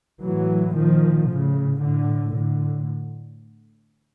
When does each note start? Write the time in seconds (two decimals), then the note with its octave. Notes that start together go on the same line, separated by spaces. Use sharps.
0.23 A2 E3 F#3
0.76 A#2 D#3 F3
1.30 A2 C#3
1.82 A2 D3
2.34 A2 D3